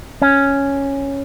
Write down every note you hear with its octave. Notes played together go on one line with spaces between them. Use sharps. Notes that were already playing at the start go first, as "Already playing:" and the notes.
C#4